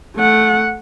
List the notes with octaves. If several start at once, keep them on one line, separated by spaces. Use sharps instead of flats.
A3 F#5